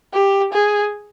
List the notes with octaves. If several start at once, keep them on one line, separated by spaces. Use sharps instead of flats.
G4
G#4